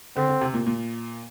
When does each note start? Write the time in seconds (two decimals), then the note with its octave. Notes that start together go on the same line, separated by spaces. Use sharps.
0.16 D3 C4
0.29 D3
0.41 C3
0.54 A#2
0.67 A#2